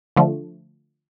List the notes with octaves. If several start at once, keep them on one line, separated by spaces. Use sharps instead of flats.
D3 F3 A3